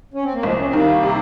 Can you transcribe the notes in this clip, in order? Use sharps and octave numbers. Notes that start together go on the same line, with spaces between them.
C#4
C4
A#3
C2 F3 G#3
C#4
C4
D#3 G3 A#3
C3